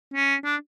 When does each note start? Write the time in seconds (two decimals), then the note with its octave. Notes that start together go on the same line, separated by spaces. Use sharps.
0.14 C#4
0.45 D4